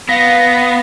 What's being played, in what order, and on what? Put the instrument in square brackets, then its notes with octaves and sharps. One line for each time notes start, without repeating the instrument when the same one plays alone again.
[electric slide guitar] B3 [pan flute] F5 [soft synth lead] A#6